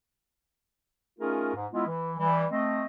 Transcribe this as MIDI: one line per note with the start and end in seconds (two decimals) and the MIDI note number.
1.18 1.50 57
1.18 1.50 61
1.18 1.50 63
1.18 1.50 65
1.18 1.50 68
1.18 1.50 70
1.54 1.66 44
1.72 1.85 56
1.72 1.85 59
1.72 1.85 64
1.72 1.85 65
1.86 2.13 52
2.18 2.45 52
2.18 2.45 55
2.51 2.85 57
2.51 2.85 60
2.51 2.85 75